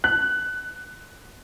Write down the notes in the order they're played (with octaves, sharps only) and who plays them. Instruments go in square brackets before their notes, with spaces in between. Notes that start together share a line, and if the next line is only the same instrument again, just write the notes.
[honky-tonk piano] F#6